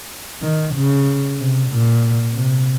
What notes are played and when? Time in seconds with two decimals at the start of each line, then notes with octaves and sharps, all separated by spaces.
0.42 D#3
0.75 C#3
1.38 C3
1.70 A#2
2.33 C3